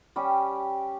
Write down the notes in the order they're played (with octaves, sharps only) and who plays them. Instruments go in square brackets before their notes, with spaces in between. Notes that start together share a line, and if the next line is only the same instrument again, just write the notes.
[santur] G3 C#4 G4